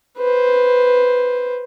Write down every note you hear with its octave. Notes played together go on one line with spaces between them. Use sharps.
B4 C5